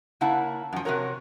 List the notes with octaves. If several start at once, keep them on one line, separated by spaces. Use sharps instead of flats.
C#3 A#3 E4 F#5 A5
F#2 F3
C3 E3 F#4 A#4 C#5